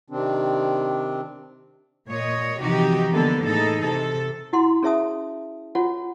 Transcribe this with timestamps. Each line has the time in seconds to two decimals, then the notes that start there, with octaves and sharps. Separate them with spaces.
0.10 C3 D#3 C4 D4
2.08 A#2 C#5 D#5
2.61 C3 E3 F3 D#4 F#4 G4
3.13 D3 G#3 A#3 B3 A4
3.45 A2 E3 D#4 G#4 A4
3.82 C3 A4
4.53 E4 F#4 F#5 C6
4.83 C#4 G#4 C#5 E5 A5 D#6
5.75 F4 F#4 C#5 F#5